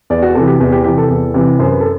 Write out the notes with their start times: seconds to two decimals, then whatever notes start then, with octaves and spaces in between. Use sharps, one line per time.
0.10 E2 D5
0.22 F#4
0.35 C3 E3 A4
0.47 G4
0.60 E2
0.72 G4
0.84 C3 E3 G4
0.98 A4
1.10 E2
1.34 C3 E3
1.59 F#2 C5
1.70 B4
1.80 A4